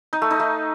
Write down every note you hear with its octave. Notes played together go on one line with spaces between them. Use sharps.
D#4
A3
D#4
A3